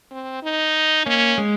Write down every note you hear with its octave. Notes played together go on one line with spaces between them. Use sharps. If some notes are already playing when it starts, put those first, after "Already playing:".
C4
D#4
A#3 C#4
G#3